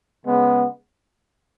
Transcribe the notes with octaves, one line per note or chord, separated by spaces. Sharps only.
C#3 G#3 B3